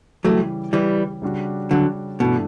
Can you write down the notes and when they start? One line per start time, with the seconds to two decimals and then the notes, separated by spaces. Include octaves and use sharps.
0.25 C#3 E3 F#3 G3 A3
0.73 E3 G3
1.22 C#3 G3 D4 F#4
1.71 D3 F#3
2.20 G2 B2 E3 A3 D4